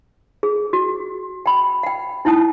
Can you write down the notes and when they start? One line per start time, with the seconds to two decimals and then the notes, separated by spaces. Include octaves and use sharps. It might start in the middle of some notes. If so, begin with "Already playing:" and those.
0.43 G#4
0.73 F#4
1.46 G5 B5
1.83 F#5 G5
2.25 D#4 E4 G5 A5 D#6